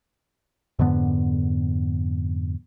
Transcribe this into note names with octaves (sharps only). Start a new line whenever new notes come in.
F2 G#2 D3 B3